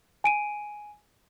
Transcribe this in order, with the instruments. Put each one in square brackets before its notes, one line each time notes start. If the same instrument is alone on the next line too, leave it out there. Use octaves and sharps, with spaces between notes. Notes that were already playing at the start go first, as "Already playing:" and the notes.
[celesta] G#5 D7 D#7